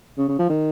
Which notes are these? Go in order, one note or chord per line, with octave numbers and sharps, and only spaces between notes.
C#3
C#3
F3
D#3